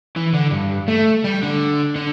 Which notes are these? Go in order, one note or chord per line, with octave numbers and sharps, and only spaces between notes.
E3
D3
G2
A3
G3
D3
D3